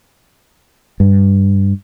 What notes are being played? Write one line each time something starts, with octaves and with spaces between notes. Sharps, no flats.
G2